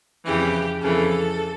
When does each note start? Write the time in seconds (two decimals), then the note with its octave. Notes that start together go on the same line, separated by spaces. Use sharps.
0.24 F2 C#3 E3 G4
0.81 F2 C#3 E3 A4